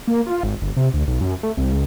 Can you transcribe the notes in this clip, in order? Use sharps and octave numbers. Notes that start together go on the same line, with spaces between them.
A#3
F4
G#1
G1
C3
D2
B1
F#2
A3
C2
C#2